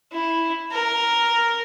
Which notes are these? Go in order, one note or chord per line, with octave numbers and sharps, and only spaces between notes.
E4
A#4